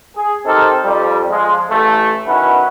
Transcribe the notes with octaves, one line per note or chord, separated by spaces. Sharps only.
G#4
C4 D#4 G4 A4 A#4 C5
F2 G3
F3 G#3
A1 A3
D#3 F#3 C#4 E4 F#4 B4